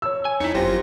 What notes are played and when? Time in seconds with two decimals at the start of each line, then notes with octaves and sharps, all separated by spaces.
0.02 C#5 E6
0.25 G#5
0.40 F2 D#4 E4 C#5
0.54 G1 F#2 F4 G4 C5 G5 A#6